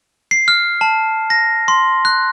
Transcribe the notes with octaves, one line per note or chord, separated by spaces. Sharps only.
C7
F6
A5
A#6
C6
F#6